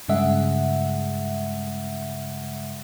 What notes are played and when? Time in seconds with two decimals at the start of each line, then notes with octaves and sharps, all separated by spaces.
0.08 G2 C#3 G#3 E5 F#5